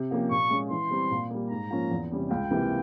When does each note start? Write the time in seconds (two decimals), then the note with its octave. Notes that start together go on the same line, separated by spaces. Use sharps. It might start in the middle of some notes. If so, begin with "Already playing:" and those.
Already playing: C3
0.11 F3 A#3 C#4 G4
0.30 A#2 C#6
0.50 G#3 C#4
0.70 E3 C6
0.91 G3 C4
1.11 A#2
1.30 G3 A#3
1.50 G#2 A#5
1.71 F3 A#3 C#4 F4
1.91 E2
2.11 C3 G3 C#4
2.30 C#2 G5
2.51 C3 E3 A#3